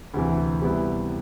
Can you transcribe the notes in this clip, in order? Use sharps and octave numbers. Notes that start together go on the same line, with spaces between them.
D2 C3 E3
C3 G3 B3 E4